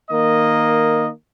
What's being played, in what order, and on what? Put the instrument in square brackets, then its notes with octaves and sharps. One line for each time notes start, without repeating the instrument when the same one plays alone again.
[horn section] D#3 A#3 D#5